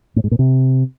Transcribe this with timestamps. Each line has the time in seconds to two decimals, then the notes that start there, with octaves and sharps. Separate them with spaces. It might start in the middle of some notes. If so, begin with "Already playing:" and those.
0.16 A2
0.24 G#2
0.31 A#2
0.39 C3